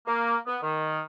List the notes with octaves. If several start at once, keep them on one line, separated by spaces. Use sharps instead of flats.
A#3
B3
D#3